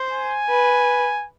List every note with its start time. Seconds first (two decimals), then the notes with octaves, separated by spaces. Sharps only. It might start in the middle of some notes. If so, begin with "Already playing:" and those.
Already playing: C5
0.12 G#5
0.50 B4